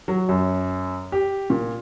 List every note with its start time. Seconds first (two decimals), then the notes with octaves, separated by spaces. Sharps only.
0.08 F#3
0.29 F#2
1.12 G4
1.50 A#2